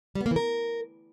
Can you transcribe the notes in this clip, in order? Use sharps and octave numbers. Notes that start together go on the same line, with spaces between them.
G3
B3
A#3
E3
A#4